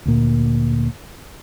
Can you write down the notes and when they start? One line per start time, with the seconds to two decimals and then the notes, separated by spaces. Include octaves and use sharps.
0.05 D2 A#2